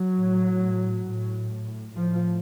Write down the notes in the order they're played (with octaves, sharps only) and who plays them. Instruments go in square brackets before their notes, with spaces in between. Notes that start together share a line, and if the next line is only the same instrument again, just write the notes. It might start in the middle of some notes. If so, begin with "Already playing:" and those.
Already playing: [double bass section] F#3
A2
A2
A2 F3